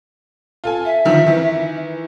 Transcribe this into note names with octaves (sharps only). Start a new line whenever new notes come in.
F4 A4 G#5
E5
D3 D#3 F3
D#3 E3